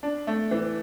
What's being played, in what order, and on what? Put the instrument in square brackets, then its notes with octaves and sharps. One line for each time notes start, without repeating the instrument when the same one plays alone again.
[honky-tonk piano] D4
A3
E3